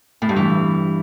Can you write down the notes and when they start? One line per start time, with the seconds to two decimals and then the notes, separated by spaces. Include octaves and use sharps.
0.22 A2
0.29 G2
0.36 E3